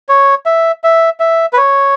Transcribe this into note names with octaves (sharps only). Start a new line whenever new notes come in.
C#5
E5
E5
E5
B4
C#5